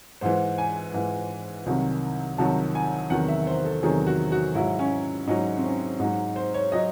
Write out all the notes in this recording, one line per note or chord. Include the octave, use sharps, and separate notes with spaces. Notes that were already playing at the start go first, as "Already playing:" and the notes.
G#2 E3 C5
G#5
G#2 E3
C2 C3 D#3 F#3
C2 C3 D#3 F#3 A5
G#5
E2 C3 D#3 F#3 F#5
E5
C5
A4
E2 C3 D#3 F#3 G#4
F#4
F#4
G#2 F#3 E4
C#4
G#2 F#3 D#4
C4
C#4
G#2 F#3 D#4
C5
C#5
F#3 D#5